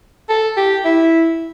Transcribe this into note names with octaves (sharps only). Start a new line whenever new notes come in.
A4
G4
E4